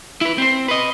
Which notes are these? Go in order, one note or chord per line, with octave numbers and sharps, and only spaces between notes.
E4 B4
C4 C5
B4 D#5